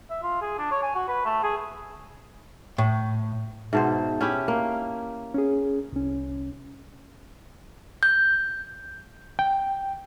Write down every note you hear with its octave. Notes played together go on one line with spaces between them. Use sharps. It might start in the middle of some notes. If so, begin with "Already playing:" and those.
E5
F4
G#4
D4
C#5
G#5
F#4
B4
A3
G#4
A2
G#2 B2 C5 E5 A5
C#4 E4 G4
A#3
C#4 G#4
C2 C#4
G6
G5